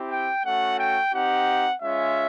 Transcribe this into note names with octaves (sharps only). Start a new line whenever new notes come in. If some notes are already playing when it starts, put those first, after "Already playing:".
Already playing: C4 E4 G4
G5
A3 C#4 F#4 F#5
G5
C4 D#4 G4 F#5
G#3 C#4 F4 E5